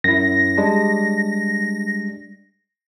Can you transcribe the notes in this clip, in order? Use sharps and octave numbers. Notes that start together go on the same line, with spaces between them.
F#2 E4 A#6
G3 G#3 D4